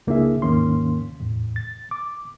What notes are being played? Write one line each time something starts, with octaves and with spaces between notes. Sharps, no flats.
C#2 A#3 D4 E4 G#4 E5
D#2 G#2 D#3 A#3 C#4 C6
E2 A2
A6
D6